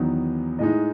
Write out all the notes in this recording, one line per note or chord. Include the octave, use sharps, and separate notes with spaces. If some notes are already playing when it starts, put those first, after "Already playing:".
Already playing: E2 D#3 F#3 B3 D#4
A2 G#3 D#4 D#5